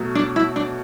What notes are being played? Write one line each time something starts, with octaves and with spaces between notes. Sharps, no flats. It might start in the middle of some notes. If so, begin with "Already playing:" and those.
Already playing: B2 F#3 A3 F#4
D4
E4
D4